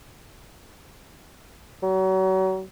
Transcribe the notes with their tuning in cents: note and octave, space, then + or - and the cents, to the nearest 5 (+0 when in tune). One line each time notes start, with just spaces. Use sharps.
F#3 +35